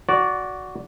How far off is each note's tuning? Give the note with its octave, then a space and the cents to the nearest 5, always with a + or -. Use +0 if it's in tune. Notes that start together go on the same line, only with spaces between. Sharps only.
F#4 +0 D5 -15